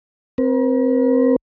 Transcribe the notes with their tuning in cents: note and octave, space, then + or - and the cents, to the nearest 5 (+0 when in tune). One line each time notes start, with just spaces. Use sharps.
C4 +0 A#4 +45